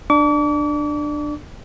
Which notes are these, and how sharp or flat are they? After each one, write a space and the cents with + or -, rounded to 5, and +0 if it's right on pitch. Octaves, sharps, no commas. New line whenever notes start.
D4 +15 D6 -40